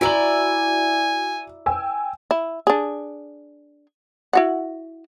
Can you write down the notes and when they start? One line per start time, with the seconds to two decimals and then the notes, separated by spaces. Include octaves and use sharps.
0.01 E4 F#4 D5 G#5 A#5 F#7
1.66 G5 G#5 E6
2.31 E4
2.67 D4 G#4
4.33 E4 F#4 F#5